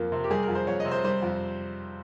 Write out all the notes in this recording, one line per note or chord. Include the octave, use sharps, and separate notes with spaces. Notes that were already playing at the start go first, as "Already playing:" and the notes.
Already playing: F2 F3 A#3
C3
G4
G3 G#4
A#4
F2
C5
F2 C#5
D#5
C3
C5
G3 C5
F2